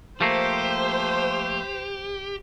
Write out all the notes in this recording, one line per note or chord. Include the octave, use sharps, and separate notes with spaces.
F3 A3 A#3 G4 C5